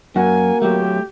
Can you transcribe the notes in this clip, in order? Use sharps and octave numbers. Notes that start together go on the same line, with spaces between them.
F#2 A#3 F#4 G#5
F#3 A3 G4